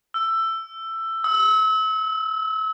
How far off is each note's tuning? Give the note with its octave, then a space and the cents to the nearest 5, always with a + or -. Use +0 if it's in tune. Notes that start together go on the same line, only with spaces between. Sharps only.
E6 +15
E6 -35